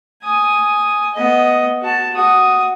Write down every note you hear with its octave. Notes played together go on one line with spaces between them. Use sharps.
G#5 D#6
B3 D#5
F#4 A5
F#4 D#6